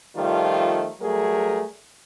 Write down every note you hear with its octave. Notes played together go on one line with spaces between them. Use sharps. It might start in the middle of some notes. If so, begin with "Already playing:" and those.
D#3 F3 G3 A3 F4
F#3 G3 A3 G#4 A#4